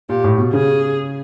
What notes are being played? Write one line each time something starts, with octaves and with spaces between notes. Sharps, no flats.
A#2 G4
A2
B2
C#3 G#4